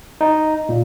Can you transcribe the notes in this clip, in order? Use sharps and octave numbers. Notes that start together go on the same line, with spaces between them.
D#4
A#2